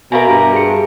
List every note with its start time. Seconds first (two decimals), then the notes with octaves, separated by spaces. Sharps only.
0.12 B2 A#4 E5 F5 G#5 A#5
0.28 G2
0.54 G#4 C#7